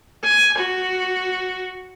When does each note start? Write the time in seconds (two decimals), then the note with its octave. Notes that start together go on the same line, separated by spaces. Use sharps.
0.25 G#5
0.58 F#4